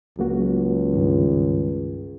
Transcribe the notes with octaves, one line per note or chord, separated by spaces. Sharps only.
C#2 F#3 A#3 F#4
G2 D#3